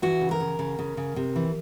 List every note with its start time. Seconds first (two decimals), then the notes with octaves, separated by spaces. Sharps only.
0.02 E3 F#4
0.21 C#3
0.31 A#4
0.40 C#3
0.59 C#3
0.79 C#3
0.97 C#3
1.16 C3
1.36 E3